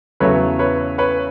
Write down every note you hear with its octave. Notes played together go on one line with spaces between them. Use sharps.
E2 C#3 F#3 A3 B4 C#5
B4 C#5
B4 C#5